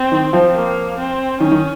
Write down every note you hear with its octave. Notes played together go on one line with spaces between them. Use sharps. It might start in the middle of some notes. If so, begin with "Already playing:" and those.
Already playing: C4
D#3
F3
A#3
C4
D#3 C#4
D#3